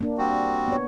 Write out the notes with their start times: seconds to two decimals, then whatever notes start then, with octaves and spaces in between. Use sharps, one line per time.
0.01 A#3 D4
0.18 G3 C4 F#4
0.68 B3 C#5